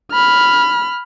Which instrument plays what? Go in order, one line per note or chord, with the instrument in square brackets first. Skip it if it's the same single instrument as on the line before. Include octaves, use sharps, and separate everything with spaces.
[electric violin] B5 F6